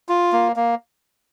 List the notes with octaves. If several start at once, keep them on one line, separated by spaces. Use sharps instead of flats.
F4
A#3
A#3